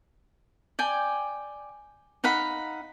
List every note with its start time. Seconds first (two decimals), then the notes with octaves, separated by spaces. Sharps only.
0.79 D5 G5 G#5
2.24 D#4 F5 F#5 B5